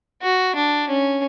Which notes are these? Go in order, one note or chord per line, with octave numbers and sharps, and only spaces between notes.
F#4
D4
C#4